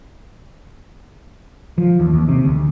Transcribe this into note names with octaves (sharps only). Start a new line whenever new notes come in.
F3
D#2
D#2
C3
D2